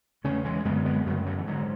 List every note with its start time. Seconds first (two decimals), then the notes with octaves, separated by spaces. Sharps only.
0.24 E2 C#3 A3 C#4
0.45 E3 G#3
0.65 F#2 D3 G#3 B3
0.85 G#3 B3
1.06 F#2 F#3 A3
1.10 C#3
1.26 D3 F#3
1.38 E3
1.47 G#2 D3 F#3